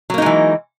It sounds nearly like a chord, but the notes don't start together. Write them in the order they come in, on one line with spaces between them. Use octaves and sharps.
F#3 A#3 D#4 G#3 E3